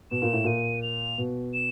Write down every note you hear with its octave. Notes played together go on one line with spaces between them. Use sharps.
B2 E7
A#2
A2
A#2 D#7
F7
B2
E7